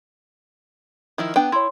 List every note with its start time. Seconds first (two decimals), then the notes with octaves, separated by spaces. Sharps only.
1.18 D#3 F3 E4
1.36 B3 D4 G5
1.52 E4 C#5 C6